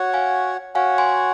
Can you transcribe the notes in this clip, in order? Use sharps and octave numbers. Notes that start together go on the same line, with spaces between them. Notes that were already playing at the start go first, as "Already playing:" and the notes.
Already playing: F#4 C#5 F#5
F5 G#5
F#4 C#5 F5 F#5 G#5
G#5 C6